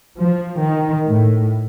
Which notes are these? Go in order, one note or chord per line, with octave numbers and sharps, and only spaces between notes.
F3
D#3
A2